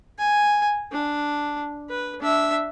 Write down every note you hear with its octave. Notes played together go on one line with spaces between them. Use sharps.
G#5
D4
B4
D4 E5